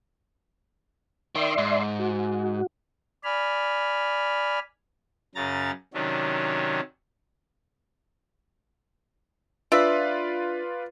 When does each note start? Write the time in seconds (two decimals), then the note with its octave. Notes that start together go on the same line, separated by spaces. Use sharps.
1.35 D#3 D5 E5 C6
1.58 G#2
1.99 F#4
3.24 D5 G#5 B5 F6
5.35 F#2 C#3 A#5 A6
5.94 C3 D#3 F#3 C#4 D4
9.72 D4 F4 B4 D5 E5